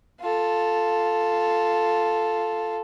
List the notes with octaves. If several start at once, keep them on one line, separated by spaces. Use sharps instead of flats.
F4 A4